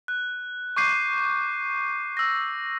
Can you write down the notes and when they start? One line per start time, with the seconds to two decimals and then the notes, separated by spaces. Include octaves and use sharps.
0.08 F#6
0.76 C#6 D6 G6 C7 D#7
2.17 E6 A#6